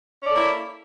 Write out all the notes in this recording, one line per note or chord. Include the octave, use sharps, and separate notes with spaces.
A#3 C#4 E4 A4 D5